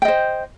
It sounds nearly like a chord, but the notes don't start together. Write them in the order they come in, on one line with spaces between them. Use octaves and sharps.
G5 D#5 C5